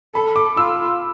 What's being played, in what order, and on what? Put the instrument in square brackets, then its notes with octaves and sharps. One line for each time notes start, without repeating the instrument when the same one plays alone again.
[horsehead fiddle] A4 [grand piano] B5
[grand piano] D6
[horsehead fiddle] F4 [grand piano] E6